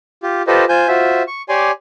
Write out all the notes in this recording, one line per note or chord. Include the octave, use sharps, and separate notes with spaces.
F4 G4
F4 G4 A4 B4 C5 D#5
F4 C5 G#5 G6
F4 F#4 C5 E5
C#6
G4 C#5 D5 G#5 C6